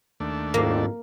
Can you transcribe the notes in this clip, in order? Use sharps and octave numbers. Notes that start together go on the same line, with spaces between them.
D#2 A3 D4
F#1 F2 G#2 D#3 A#3